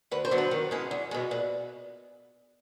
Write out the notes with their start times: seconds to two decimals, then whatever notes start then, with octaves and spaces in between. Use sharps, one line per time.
0.11 D2 B4
0.25 C5
0.31 D3 F#3 B3
0.38 B4
0.51 D#3
0.71 G#3 C#4 E4
0.91 E2
1.11 B2 G#3
1.31 A#2 B4